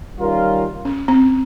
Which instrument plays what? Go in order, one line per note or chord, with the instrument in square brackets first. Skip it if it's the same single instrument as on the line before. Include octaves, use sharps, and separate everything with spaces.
[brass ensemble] D#3 G3 C#4 F4 A#4
[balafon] C#4
C4